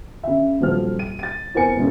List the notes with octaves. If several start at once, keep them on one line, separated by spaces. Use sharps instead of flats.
C#3 E5
D#1 A#2 F3 F#3 C4 F6
D#7
A6 D#7
E2 C4 A#4 G#5 C#7
E1 B1 F#2